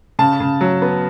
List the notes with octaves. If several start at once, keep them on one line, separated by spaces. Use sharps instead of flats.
C#3 A5
C#3
F#3
B3